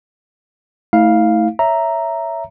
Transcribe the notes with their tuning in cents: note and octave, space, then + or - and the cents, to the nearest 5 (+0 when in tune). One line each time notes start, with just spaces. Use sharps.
A3 +0 E4 -40 F5 +0
C#5 +20 E5 +5 A#5 +0